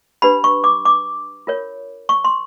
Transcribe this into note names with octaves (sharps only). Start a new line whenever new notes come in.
D4 G4 B4 B5
C#6
D6
D6
F4 A#4 C#5
C#6
C6